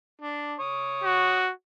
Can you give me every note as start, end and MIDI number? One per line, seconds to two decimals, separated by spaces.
0.22 0.54 62
0.60 1.45 73
0.60 1.45 87
1.04 1.51 66